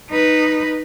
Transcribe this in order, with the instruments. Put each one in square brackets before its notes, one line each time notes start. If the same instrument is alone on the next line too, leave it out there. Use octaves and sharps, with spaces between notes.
[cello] D#4 B4